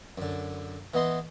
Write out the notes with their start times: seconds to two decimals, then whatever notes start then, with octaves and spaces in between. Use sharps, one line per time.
0.18 F#2 D3
0.94 E3 B3 D#5 C6